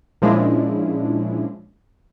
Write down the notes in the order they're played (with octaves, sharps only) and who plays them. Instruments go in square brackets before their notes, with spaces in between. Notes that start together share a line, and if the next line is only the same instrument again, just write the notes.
[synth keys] A#2 F3 G#3 C#4 D4 E4